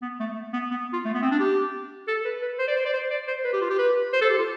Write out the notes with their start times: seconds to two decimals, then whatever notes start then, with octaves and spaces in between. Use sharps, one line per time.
0.02 B3
0.20 A3
0.53 B3
0.71 B3
0.93 F4
1.05 A3
1.14 B3
1.22 C4
1.31 D4
1.39 G4
2.08 A4
2.25 B4
2.42 B4
2.59 C5
2.68 D5
2.76 C5
2.85 D5
2.93 C5
3.10 D5
3.27 C5
3.44 B4
3.53 G4
3.61 F4
3.70 G4
3.78 B4
4.13 C5
4.21 A4
4.30 G4
4.38 F4